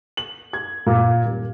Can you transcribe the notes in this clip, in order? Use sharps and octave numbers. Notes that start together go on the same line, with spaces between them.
F#7
G#6
A#2
D#1